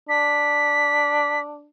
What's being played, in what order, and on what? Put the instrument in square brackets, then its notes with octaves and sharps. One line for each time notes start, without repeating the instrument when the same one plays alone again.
[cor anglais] D4 [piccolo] B6